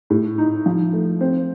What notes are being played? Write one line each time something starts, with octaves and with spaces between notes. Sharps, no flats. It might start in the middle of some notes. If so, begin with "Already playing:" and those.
A2
D#4
F3
A3
C4